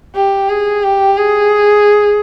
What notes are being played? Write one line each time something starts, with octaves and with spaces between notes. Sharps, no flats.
G4
G#4
G4
G#4